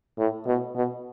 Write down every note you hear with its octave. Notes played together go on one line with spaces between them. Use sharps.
A2
B2
B2